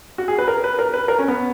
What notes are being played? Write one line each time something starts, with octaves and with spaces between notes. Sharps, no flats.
F#4
G#4
B4
A#4
B4
A#4
B4
A#4
C#4
B3